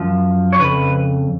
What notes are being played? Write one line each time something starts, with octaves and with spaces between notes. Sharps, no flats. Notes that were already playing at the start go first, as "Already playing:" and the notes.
Already playing: F#2 F3
C#5
F2 C#3 B4